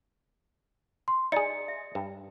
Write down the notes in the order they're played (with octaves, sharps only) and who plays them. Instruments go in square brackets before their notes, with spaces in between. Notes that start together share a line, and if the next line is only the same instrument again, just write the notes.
[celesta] C6
[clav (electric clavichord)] D#4 G#4 [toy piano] D5 D#5 [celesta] C#7
[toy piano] E5
[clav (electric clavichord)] G2